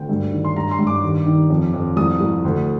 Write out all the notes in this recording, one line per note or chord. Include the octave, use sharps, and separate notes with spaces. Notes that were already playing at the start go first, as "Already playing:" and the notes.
Already playing: D2 G5
G2
D#3
C6
G2 A#5
C6
G2
D6
D#2
D#3
F2
F2
C2 D#6
C2
D2